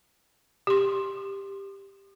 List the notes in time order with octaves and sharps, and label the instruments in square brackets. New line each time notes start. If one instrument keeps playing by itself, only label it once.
[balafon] G4 C6